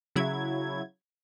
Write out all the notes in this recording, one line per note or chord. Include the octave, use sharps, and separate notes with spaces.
C#3 F#3 E4 G#6